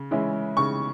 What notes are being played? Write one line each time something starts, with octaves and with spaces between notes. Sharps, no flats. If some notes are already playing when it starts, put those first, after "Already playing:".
Already playing: C#3
E3 G#3 C#4 E4
C#3 C#6